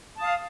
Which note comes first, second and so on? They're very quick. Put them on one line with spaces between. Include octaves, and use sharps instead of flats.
A5 D#6 F5